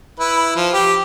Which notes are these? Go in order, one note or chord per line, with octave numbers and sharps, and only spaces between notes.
E4 B4
F3
G4